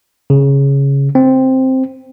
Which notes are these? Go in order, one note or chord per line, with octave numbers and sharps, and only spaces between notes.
C#3
C4